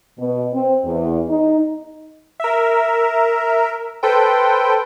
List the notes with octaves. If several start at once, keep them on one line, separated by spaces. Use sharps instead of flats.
B2
C4
E2
D#4
A#4 E5
A4 B4 C5 G5